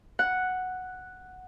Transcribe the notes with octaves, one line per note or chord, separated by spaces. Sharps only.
F#5